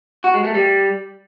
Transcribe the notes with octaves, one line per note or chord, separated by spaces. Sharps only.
F#4
G#3
A3
G3